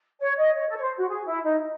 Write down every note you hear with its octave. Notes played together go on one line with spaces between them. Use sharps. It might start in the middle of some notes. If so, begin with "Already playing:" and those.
C#5
D#5
C#5
A4
C#5
C5
F#4
G#4
E4
D#4